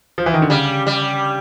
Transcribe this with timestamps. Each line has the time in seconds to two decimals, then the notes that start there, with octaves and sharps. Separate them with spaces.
0.18 F3
0.26 E3
0.34 D#3
0.42 D3
0.50 C#3 G3
0.87 G3